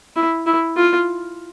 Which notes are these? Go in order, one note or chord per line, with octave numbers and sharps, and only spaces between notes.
E4
E4
F4